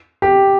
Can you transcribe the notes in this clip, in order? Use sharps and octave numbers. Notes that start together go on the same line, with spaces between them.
G4